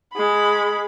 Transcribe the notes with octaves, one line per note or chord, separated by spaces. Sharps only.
G#3 B5